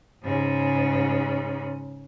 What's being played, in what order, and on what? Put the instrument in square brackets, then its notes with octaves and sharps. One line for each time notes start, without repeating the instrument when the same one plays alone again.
[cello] G#2 C#3